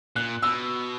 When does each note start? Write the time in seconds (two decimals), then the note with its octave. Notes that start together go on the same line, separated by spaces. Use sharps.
0.16 A#2 F#6
0.42 B2 E6